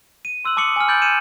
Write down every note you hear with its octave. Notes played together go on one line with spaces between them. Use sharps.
D#7
C6 E6 F#6 F#7
A5 D6 D#6 C#7 F#7
G#5 F6
B5 D6 G6 A6 D7 F#7
G6 G#6 C#7 D#7 E7